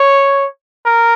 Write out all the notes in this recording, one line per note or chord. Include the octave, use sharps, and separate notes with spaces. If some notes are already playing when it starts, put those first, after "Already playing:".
Already playing: C#5
A#4